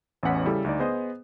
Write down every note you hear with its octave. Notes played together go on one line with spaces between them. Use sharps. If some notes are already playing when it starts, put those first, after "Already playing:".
A1 E2 C#4 F#5 B6
C#3 G3 E4 A4
D2 D#4 D5
B3 G#4 C5 D#5